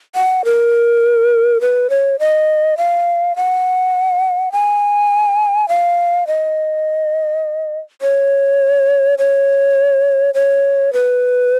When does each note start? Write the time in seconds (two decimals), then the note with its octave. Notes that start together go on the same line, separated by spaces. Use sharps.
0.15 F#5
0.45 A#4
1.61 B4
1.90 C#5
2.19 D#5
2.78 F5
3.36 F#5
4.52 G#5
5.69 F5
6.27 D#5
8.02 C#5
9.18 C#5
10.34 C#5
10.93 B4